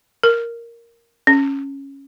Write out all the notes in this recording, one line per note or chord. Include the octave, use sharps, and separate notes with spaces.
A#4
C#4